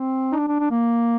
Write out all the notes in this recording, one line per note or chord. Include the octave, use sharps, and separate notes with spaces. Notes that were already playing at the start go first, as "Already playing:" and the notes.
Already playing: C4
D#4
D4
D4
D4
A#3